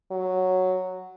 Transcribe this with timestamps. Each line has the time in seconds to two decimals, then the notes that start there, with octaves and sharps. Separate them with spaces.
0.11 F#3